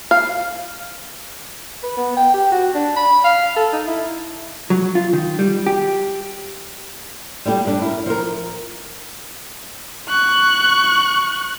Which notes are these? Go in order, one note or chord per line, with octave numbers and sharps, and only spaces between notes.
F5
B4
B3
G5
G4
F#4
D4
B5
F5
A4
D#4
E4
F#3
F4
D#3
G3
G4
G3 A3 E4 G4
G2 D4
E4 A#4
F3 A#4
C#6 F#6